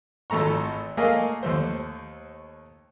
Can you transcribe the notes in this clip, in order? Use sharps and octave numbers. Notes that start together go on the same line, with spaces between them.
G#1 A3 A4 A#5 C#6
A3 A#3 G#4 A#4 D#5 F5
D#2 A3 C5